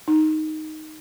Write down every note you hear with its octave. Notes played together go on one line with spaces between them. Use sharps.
D#4